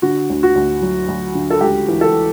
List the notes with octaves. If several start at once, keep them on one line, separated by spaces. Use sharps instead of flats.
D3 F#4
D2
F#4
D2
F#3
D2
D3
A4
C#2 G4
E3
A4